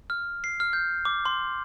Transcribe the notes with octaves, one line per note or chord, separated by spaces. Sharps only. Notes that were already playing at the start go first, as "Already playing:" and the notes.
F6
C7
F6
G6
D6
C6